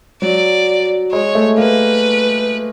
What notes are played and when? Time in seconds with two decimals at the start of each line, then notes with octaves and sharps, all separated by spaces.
0.22 F#3 D5
1.12 G#3 C#5
1.35 A3
1.57 A#3 B4